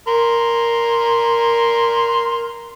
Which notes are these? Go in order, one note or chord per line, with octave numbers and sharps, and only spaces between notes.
A#4 C6